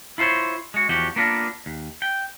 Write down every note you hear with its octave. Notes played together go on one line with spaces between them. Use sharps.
E4 F4 A4 C5 C#5
G#3 F#4
E2 F3 F#4 G4
A#3 B3 D4 F4 G4 A#4
D#2
G5